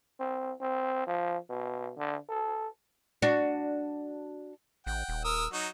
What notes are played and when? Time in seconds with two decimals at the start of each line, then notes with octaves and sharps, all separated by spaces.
0.20 C4
0.61 C4
1.07 F3
1.49 B2
1.97 D3
2.29 A4
3.22 D4 F#4
4.87 A1 F#5 G5
5.09 D#1
5.24 A#4 D#6 E6
5.53 F#3 D#4 F#4